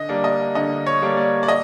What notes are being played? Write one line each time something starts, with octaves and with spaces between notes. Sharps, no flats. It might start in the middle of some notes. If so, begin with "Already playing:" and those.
Already playing: D3 D#5
G3 A#3 D4
D#5
D3 D#5
C#5
G3 A#3 D4
D5
D5
D#5